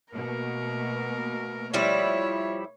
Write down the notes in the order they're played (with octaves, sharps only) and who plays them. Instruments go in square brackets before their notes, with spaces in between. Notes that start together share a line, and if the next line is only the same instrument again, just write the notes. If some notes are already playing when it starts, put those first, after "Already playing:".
[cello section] B2 A3 A#3 [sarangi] A#4
[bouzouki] F3 G3 E4 [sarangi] C#5